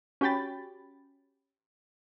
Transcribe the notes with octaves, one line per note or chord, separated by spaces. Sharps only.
C#4 F#4 G4 G5 B5 A6